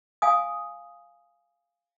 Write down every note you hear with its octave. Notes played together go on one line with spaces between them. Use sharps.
F5 G#5 D#6